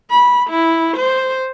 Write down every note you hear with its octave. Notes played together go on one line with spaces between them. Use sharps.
B5
E4
C5